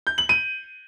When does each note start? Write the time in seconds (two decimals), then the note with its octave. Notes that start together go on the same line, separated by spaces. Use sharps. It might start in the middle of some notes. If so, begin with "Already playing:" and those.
0.07 G6
0.18 F#7
0.29 D#7